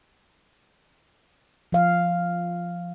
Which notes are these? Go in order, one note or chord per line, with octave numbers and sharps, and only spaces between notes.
F3 F5